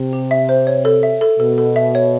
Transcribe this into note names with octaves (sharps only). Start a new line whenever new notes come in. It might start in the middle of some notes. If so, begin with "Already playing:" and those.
Already playing: C3
G4
E5
C5
C#5
A4
E5
A4
B2 A4
A4
E5
C#5